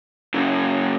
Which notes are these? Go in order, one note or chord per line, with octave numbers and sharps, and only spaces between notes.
F#2 C#3